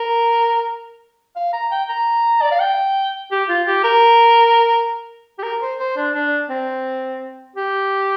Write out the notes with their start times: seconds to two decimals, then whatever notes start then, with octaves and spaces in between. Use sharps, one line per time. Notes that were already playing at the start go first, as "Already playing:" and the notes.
Already playing: A#4
1.36 F5
1.54 A#5
1.72 G5
1.89 A#5
2.42 D5
2.52 F5
2.60 G5
3.32 G4
3.49 F4
3.67 G4
3.84 A#4
5.39 G4
5.43 A#4
5.62 C5
5.79 C5
5.97 D4
6.15 D4
6.50 C4
7.56 G4